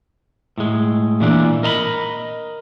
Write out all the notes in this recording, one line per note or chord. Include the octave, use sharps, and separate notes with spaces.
A2 G#3
A#2 E3 D4
A#4 D#5 A#5 B5